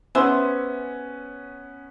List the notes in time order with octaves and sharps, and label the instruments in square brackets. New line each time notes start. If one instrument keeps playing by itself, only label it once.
[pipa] G#3 C5 E5 [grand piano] B3 C#4